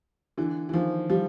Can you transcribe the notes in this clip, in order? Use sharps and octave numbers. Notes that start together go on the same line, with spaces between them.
D3 E3
E3
D#3 F3
F3 G3